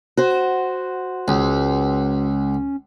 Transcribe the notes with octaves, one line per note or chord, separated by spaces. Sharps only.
F#4 C5
C#2 C#4